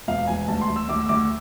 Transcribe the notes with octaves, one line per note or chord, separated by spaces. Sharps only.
E1 F5
E1 G#5
D2 A5
C6
D2
E6
D2 D6
E6
D2 D6